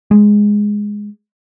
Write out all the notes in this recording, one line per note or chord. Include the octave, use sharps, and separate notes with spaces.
G#3